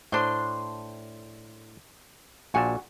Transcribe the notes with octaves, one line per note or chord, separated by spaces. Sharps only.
A2 D4 C5 C6
A#1 A#2 F#4 F#5 G#5 A5